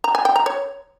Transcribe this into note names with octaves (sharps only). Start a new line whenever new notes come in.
A#5
G#5
G5
A#5
C#5